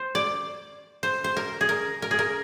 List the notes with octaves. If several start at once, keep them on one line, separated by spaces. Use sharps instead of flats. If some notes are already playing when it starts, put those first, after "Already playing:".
Already playing: C5
D5
C5
C5
A#4
G#4
A#4
A#4
G#4
A#4